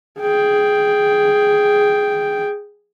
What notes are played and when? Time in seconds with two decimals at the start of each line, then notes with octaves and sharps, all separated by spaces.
0.21 G#4 G5